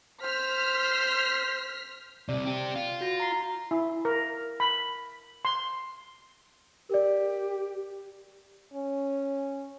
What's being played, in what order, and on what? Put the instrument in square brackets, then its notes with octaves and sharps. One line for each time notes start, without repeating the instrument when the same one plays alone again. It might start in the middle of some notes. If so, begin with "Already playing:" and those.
[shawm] C5 [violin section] F6 B6
[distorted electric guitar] C2 C3 [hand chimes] D5
[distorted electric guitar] C4 G4
F4
[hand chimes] F#4 A#6
A#5 C7
[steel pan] E4
A#4
B5
C6
[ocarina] G4 [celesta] A#4 D5
[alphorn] C#4